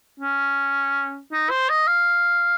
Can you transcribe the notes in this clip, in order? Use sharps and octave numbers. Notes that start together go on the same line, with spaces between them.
C#4
D#4
C5
D#5
F5